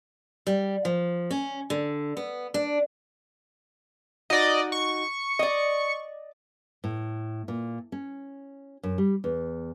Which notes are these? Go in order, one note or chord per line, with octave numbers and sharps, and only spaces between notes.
G3
F3
C#4
D3
B3
D4
D#4 F#4 D5 D#5
C#6
D5 D#5
A2
A#2
C#4
F#2
G3
E2